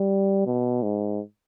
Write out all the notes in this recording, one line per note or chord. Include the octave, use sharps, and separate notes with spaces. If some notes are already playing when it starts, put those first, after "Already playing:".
Already playing: G3
B2
G#2